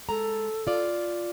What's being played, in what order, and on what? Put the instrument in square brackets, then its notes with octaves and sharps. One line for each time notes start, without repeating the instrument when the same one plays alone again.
[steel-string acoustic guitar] G#3 A#5 [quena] A4
[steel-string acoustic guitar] F4 D5